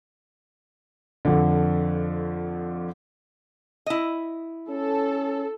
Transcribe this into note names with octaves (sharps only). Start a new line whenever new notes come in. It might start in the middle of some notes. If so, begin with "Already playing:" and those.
F2 D3
E4 D#5
C#4 A4